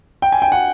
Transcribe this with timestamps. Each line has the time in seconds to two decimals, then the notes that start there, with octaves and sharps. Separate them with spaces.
0.22 G5
0.32 G#5
0.42 G5
0.52 F#5